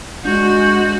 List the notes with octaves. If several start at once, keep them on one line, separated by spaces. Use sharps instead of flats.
G#3 D4 F#4 G6